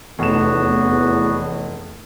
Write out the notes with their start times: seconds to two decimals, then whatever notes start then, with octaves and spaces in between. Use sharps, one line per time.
0.19 F1 E2 A3 B3 F#4 G#4 C#5 E7